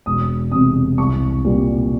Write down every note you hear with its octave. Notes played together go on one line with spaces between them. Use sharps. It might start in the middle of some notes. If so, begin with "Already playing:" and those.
E1 D#6
E2 C3 D#6
C2 C#6
A#2 G3